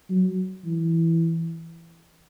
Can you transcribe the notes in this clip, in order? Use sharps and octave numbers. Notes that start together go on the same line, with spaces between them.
F#3
E3